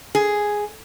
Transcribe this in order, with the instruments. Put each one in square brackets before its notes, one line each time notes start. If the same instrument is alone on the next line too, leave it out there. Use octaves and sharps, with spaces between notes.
[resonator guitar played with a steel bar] G#4